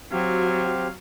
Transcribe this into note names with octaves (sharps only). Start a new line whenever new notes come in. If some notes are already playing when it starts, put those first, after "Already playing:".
F#3 C4 F#4 G4 F5